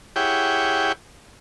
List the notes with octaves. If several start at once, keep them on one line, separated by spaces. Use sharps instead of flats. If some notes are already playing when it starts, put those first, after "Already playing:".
E4 G4 G#4 C#5 F#5 G5